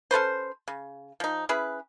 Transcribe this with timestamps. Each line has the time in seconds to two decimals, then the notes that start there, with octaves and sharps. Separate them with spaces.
0.11 C#4 A4 B4 C5
0.68 C#3
1.20 F3 D#4
1.49 C#4 E4 G#4 B4